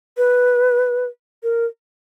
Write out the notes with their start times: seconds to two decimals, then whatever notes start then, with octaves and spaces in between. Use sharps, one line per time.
0.17 B4
1.43 A#4